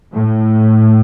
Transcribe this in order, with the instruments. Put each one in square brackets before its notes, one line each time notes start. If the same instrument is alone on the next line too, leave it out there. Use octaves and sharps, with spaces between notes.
[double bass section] A2